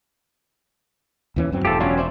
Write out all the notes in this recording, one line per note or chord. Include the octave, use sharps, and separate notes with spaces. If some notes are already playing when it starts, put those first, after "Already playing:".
D#2 E3 C#4
F#2 F#3 C4
E1 G#2 A3 F4 G4 A4
F#3 C#4 D4 F4 C#5
C5 D5 E5